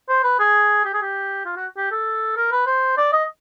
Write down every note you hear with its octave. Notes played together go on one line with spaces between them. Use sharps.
C5
B4
G#4
G4
G#4
G4
F4
F#4
G4
A4
A#4
B4
C5
D5
D#5